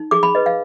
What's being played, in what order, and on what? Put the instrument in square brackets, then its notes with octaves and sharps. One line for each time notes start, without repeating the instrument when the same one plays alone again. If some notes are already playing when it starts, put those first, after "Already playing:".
Already playing: [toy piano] D#4
G#4 D6
B5
B4 D#5
F5